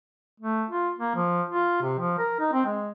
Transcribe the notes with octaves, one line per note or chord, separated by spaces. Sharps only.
A3
F4
A#3
F3
F4
C3
F3
A#4
D#4
C4
G#3